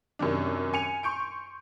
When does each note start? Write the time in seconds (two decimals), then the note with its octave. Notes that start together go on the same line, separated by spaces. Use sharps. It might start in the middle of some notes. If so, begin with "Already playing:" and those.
0.19 F#2 C3 D#3 D4
0.73 G#5 C#7 D#7 F7
1.03 C6 C#6 G6 D7